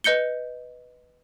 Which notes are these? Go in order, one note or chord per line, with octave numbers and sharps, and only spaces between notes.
B4 D#5 G6 C#7 G7